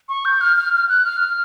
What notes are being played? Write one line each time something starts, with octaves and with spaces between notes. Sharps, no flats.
C#6
G6
F6
F6
F6
F#6
F6
F6